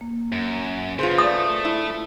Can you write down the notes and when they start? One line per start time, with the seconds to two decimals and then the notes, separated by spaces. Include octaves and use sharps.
0.01 A#3
0.32 F#2
0.99 C#3 F4 G#4 B4 C5
1.18 A3 D5 F5 D#6 A#6
1.65 E4